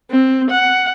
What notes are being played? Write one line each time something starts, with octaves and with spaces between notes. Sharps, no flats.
C4
F#5